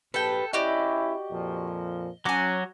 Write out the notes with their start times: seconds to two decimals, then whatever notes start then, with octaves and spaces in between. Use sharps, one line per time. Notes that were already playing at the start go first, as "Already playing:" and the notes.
0.14 A#1 G4 A4 B4 G5
0.53 C#4 E4 F#4 G4 D5 D#5
1.31 F2 A#2 F3
2.25 F#3 C#4 F#4 G#5 D6